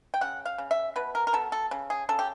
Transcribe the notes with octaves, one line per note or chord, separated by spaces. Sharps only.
G5
C#3 F#5
F5
C#3
E5
B2 B4
A#4
A#4
B2 A4
A4
C#3
G#4
C#3 A4
G4